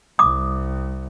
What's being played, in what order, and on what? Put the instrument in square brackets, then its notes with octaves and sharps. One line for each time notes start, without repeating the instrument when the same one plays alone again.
[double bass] C2 [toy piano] D6 D#6